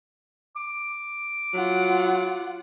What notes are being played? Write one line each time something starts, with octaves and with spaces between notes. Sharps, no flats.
D6
F#3 F4 F#5